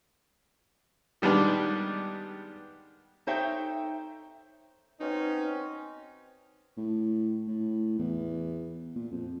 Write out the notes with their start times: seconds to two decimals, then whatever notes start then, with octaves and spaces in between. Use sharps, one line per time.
1.22 D#3 G3 G#3 B3 D4
3.27 D#4 A4 C5 C#5 E5 G5
5.00 B2 C4 C#4 D#4
6.77 A2
7.48 A2
7.98 E2
8.95 A#2
9.12 F2